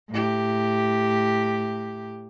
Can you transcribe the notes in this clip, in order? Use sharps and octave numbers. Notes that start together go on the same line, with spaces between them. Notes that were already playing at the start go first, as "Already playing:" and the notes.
A2 G4